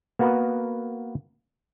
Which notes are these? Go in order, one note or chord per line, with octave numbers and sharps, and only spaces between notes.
A#3 B3 F#4 A#4 B4